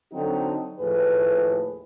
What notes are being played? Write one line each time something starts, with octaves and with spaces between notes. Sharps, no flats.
D3 F#3 C4 D#4 F#4 A4
D#2 A2 F3 G#4 B4